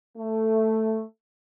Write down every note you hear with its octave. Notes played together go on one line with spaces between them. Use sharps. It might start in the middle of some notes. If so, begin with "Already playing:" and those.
A3